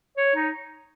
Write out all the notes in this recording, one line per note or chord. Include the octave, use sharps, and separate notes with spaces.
C#5
D#4